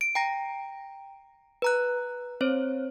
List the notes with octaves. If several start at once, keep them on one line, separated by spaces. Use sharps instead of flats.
D7
G5 A#5 A#6
B4 A#5 F#6
C4 C5 C#5